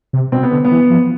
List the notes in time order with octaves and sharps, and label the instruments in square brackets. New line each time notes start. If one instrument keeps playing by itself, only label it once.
[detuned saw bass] C3
[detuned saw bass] B2 [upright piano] C4
[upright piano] B3
[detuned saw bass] D3
[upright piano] B3
[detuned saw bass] E3
F3